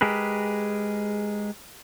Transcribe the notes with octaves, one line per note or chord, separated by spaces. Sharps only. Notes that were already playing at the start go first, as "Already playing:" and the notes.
G#3 G4 G#4 A#4 B4